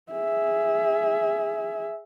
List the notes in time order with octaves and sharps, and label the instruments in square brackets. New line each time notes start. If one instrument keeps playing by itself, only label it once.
[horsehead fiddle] G#4 E5